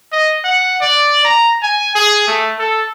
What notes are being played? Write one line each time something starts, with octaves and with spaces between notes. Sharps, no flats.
D#5
F#5
D5
A#5
G#5
G#4
A3
A4